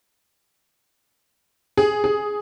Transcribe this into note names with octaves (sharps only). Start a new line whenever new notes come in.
G#4
G#4